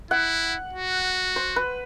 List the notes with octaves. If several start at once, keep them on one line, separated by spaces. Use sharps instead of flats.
E4 F#5
F#4
C5
B4